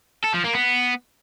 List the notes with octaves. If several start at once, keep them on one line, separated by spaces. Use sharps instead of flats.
A4
F3
A#3
B3